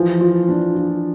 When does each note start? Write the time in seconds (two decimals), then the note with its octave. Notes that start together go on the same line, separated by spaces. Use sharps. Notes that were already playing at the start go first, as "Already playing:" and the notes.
Already playing: E3 F3
0.21 F4
0.49 D4
0.75 F4